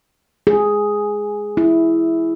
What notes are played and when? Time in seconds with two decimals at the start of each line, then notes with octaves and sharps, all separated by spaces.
0.47 G#4
1.57 E4